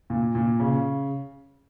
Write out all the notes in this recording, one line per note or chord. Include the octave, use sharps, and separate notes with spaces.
A#2
A#2
C#3